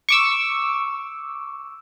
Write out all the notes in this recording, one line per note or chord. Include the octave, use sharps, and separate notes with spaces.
C#6 D6 E6